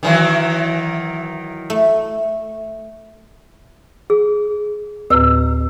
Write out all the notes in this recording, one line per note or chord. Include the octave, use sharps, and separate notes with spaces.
D#3 E3 F#3
A3
G#4
D2 A2 B4 E6